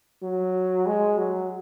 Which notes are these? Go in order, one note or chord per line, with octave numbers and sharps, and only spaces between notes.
F#3
G#3
F#3